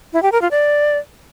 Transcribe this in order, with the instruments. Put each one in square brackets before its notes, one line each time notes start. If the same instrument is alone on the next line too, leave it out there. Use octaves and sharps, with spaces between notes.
[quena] E4
G4
A#4
F4
D5